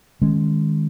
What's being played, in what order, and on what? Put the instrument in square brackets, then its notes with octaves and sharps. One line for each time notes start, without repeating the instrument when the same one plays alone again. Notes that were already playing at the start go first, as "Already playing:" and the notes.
[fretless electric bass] D#3 G#3 C#4